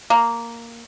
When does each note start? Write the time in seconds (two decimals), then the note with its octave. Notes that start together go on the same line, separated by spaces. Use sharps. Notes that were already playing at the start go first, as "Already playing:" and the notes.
0.10 A#3